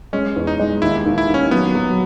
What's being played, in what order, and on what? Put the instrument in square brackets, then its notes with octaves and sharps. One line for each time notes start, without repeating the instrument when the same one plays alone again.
[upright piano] G#3 [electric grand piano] C#4
[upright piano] E2
[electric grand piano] D#4
[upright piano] G#3
[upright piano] D#2 [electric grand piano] E4
[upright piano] D#2
[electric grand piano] E4
[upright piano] D#2
[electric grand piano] C#4
[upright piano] F#3 [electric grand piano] B3
[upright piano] F#3